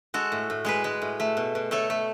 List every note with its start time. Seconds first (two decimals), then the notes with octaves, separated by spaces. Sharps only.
0.14 G#3 F#4 A4
0.32 A2
0.50 A2
0.65 G#3 G#4 B4
0.84 G#3
1.02 A2
1.20 A3
1.37 B2
1.55 B2
1.71 A3 A4 C#5
1.90 A3